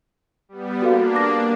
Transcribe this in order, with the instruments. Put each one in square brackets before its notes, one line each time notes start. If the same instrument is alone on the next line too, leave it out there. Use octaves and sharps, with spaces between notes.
[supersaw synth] G3 B3
[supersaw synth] A#3 D4 [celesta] F#4 A4 F5
[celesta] D6 A#6